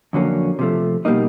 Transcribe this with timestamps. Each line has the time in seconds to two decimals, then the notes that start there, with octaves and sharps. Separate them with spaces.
0.13 F2 D3 F#3 A#3 C#4
0.59 C3 F3 A3
1.05 B2 G3 A#3 D#4